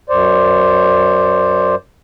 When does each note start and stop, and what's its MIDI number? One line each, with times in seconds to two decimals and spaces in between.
0.10 1.75 42
0.10 1.75 72
0.10 1.75 74